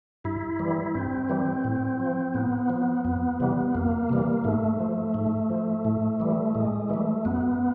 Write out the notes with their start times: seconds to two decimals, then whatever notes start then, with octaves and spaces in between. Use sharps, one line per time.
0.24 G2 E4
0.59 E3 G3
0.94 G2 C4
1.29 E3 G3
1.64 A2
2.00 F3
2.34 A2 B3
2.70 F3
3.05 F2 B3
3.40 C3 E3 G3
3.75 F2 A#3
4.09 C3 E3 G3
4.44 G#2 A3
4.80 F3
5.14 G#2
5.50 F3
5.85 A2
6.20 E3 G3
6.55 A2 G#3
6.90 E3 G3 A3
7.25 F#2 B3